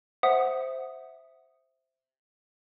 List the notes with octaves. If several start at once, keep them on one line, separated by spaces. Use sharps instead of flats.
C5 E5 F#5 D#6